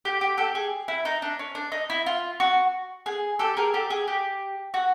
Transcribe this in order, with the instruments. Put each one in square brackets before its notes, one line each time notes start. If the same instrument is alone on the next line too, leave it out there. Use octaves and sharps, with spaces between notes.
[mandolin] G4
G4
G4 A4
G#4
E4
D#4
D4
C#4
D4
D#4
E4
F4
F#4
G#4
G4 A4
G#4 A#4
G4 A4
G#4
G4
F#4